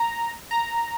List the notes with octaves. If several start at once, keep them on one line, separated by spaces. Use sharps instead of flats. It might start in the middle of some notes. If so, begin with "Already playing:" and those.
Already playing: A#5
A#5